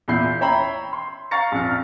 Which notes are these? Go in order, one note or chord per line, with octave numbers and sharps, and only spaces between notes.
E2 A#2 E4 B5 G6 C7
C#5 E5 G5 A#5 B5
C6
F5 A#5 C#6 A6 A#6 C#7
A#1 F2 F6